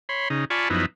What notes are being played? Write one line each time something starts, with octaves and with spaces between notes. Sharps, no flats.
C#5 B5 C6
C#3 D#4
F4 D5 G#5 A5 B5 C#6
F#2 F3 B3 D#4 E4